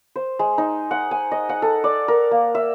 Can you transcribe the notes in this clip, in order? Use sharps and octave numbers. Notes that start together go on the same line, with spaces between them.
C5
G#3
D#4
F#5
G#5
D#5
F#5
A4
D5
A#4
A#3
E5